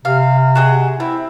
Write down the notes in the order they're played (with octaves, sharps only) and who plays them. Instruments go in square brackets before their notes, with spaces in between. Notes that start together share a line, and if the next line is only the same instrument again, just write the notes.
[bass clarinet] C3 [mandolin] F5
[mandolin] F#4 G#4 D#5
[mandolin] C4 [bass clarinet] E4